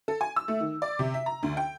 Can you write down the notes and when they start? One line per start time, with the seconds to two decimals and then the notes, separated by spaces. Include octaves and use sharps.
0.08 A4
0.21 G#5
0.36 E6
0.48 A3
0.60 D#3
0.82 D5
0.99 C3
1.14 E5
1.26 A#5
1.43 D2
1.57 G5